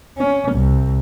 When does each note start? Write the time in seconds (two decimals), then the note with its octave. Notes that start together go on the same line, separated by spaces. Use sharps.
0.18 C#4
0.52 C2